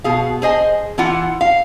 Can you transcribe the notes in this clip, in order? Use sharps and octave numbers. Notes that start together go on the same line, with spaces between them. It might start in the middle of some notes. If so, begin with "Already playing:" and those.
B2 G#4 F5
G#4 C5 D#5 G#5
E3 E4 F4 F#5
F5